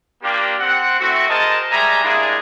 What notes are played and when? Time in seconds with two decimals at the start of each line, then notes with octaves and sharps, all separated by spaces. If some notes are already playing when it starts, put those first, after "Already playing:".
0.22 A#3 D4 F4 G4
0.59 C4 F#5
1.00 A3 C4 E4 F#4
1.29 G#4 A#4 C5 D#5 A5
1.69 G3 G#3 E5 G#5 A#5
2.03 G3 G#3 A#3 D4 E4 G#4